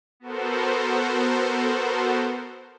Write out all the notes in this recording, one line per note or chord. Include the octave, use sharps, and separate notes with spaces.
B3 F#4 A4 A#4 C5